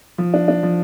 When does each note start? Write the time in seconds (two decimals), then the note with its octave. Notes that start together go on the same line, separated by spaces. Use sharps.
0.18 F3
0.34 D4
0.48 D4
0.63 F3